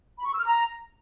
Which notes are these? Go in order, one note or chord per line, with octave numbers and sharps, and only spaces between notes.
B5
C#6
E6
F6
A#5